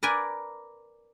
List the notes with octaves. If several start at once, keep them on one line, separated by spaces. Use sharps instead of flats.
A#4 B4 D5 G#5